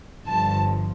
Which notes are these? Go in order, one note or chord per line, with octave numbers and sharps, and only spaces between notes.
G1 G2 F3 A5